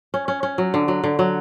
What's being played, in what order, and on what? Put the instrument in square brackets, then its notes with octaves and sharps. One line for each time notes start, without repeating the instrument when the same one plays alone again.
[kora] C#4
C#4
C#4
F#3
D3
F#3
D3
F#3